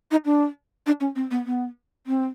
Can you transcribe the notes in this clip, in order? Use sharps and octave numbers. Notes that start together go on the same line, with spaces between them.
D#4
D4
D4
C#4
C4
B3
B3
C4